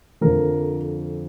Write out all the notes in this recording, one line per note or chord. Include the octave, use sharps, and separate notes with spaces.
F2 D3 F3 A#4